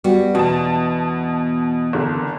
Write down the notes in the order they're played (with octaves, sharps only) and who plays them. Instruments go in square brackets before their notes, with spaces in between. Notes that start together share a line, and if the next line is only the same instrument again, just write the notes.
[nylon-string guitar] G3 B3 F#4
[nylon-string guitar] E2 [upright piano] B2 A5
[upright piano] F#1 D3